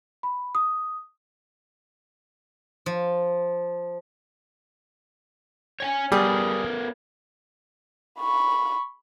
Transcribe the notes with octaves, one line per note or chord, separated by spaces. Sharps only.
B5
D#6
F3
C#5 G5 G#5
G3 B3 G#4 A#4 C#5
B5 C#6